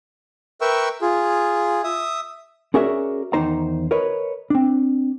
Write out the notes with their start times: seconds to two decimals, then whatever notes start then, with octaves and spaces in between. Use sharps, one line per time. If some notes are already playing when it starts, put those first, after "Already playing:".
0.61 A#4 B4 E5 G5 C#6 E6
1.02 F4 G#4
1.84 E5 D#6
2.74 C#4 F#4 G#4 A#4 D5 E5
3.33 E2 D#3 D#4 C5 A#5
3.91 A#4 B4 C#5 D#5
4.50 C4 D4